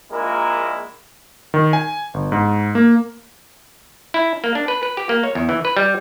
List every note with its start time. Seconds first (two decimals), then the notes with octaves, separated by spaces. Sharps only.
0.11 A#1 A#2 G#3 A#3 E4 A#4
1.54 D#3
1.73 G#5
2.14 G1
2.32 G#2
2.75 A#3
4.14 E4
4.44 A#3
4.55 D4
4.68 B4
4.83 B4
4.97 G4
5.09 A#3
5.24 C#5
5.35 E2
5.49 E3
5.65 B4
5.77 G3